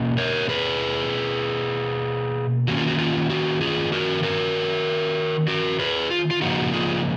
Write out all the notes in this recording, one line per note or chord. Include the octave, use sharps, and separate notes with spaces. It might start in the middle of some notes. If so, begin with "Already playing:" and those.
Already playing: B2 A#3 C#4
A#4 C#5
G#4 B4
D#3 A#3 C#4 F#4
F4
F#4
F4
F#4
F4 G#4
F#4 A#4
F#4 A#4
F#4 A#4
G#4 B4
F4
F4
C#3 F3 A#3 D#4 F#4
F4 G#4